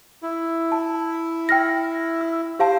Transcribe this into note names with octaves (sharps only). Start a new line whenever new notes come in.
E4
A5
G5 F6 A#6
E6
G4 C5 F5 A5